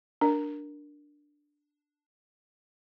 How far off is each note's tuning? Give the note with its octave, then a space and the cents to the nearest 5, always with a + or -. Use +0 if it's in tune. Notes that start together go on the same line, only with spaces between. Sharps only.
D4 +0 A#4 +0